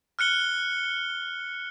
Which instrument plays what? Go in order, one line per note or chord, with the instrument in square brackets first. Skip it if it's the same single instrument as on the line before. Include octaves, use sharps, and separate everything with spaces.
[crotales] F6 F#6 C#7 G7